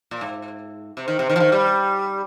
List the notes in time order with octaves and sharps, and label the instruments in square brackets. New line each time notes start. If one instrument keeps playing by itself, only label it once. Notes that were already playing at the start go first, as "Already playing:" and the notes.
[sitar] A#2
G#2
C3
D#3
C3
D#3
F3
D#3
G3